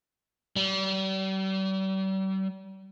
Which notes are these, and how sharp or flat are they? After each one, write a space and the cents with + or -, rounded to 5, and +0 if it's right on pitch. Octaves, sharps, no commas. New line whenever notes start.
G3 -40